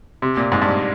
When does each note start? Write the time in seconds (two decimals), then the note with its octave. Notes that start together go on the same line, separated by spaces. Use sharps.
0.22 C3
0.37 A#2
0.52 G#2
0.62 G2